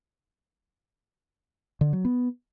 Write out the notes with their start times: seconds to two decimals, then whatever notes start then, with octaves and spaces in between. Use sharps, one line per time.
1.81 D3
1.93 F#3
2.05 B3